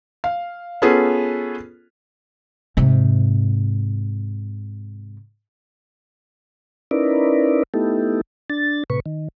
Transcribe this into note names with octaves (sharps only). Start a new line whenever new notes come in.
F5
B3 C#4 F4 G#4 A4 B4
G#2 C3
C#4 D#4 E4 A#4 B4 D5
A3 B3 D#4 E4 G4 A4
D4 A6
A2 C3 B4 C#6
D#3